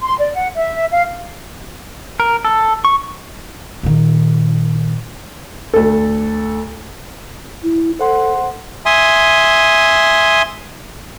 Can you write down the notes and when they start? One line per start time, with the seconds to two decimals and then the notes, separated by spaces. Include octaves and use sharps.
0.02 C6
0.19 D5
0.35 F#5
0.56 E5
0.91 F5
2.20 A#4
2.45 A4
2.85 C#6
3.83 A#2 D#3
5.74 D2 A4
7.63 E4
7.99 A4 C5 F#5 C6
8.86 E5 G#5 C6 D#6